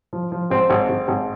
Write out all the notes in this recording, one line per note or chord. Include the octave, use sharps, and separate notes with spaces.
F3
F3
G#1 C4
G#1
G#1
G#1